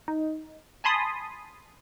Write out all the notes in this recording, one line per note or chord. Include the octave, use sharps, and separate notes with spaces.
D#4
G#5 A5 B5 C6 D#6